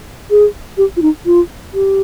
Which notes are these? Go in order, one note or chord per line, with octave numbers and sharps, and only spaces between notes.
G#4
G4
F4
D#4
F4
G4